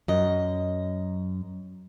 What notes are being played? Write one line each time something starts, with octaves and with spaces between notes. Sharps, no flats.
F#2 D#5